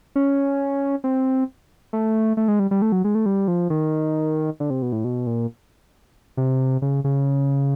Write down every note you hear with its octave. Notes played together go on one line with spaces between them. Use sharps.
C#4
C4
A3
A3
G#3
G3
G3
A3
F#3
G#3
A3
G3
F3
D#3
D3
C3
B2
A2
B2
A#2
C3
C#3
C#3